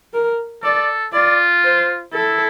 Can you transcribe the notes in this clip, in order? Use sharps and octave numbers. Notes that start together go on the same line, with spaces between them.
A#4
A4 D5
F4 D5
C5
E4 A4